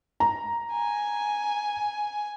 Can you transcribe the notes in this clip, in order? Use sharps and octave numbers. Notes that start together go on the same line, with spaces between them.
A#5
G#5